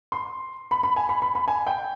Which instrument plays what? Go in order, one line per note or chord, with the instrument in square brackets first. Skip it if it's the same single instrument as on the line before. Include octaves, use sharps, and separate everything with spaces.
[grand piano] C6
B5
B5
G#5
B5
B5
B5
G#5
G5